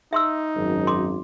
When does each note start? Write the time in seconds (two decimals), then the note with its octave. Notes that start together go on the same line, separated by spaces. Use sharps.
0.13 D#4 E5 C6 E6
0.55 G#1 F#2
0.87 C6 D6